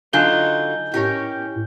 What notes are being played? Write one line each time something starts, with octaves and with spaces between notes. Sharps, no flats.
D3 F#3 D#4 F4 G#5 G6 G7
A2 C#4 G4 A#4 C#5